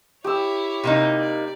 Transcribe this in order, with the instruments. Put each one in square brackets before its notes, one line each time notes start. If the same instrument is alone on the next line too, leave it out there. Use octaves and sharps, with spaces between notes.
[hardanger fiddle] E4 C#5 [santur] G4 E6
[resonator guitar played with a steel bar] C3 A#3 D#4
[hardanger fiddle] D5